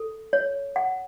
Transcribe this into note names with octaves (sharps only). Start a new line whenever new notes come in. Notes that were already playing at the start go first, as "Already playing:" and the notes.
Already playing: A4
C#5
F#5